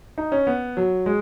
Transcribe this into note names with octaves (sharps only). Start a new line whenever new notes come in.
D#4
C#4
B3
F#3
G#3